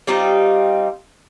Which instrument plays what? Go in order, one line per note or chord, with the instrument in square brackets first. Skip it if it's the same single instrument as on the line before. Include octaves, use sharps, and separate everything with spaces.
[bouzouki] G3 C4 D#4 F4